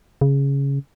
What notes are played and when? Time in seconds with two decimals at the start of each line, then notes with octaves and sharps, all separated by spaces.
0.21 C#3